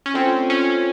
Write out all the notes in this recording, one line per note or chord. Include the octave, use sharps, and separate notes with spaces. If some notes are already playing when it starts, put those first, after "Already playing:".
C#4
A3 C4 D4 F4
C#4